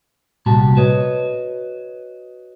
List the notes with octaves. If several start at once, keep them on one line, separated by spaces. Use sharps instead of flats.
C2 A#2 F#4 G4 A5
F#4 B4 C#5 D#5